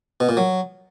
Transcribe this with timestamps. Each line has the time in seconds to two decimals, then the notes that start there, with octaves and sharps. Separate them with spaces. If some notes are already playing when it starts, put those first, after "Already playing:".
0.20 B2
0.29 A#2
0.37 F#3